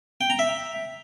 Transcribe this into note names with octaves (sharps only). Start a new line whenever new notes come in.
G5
A#5
E5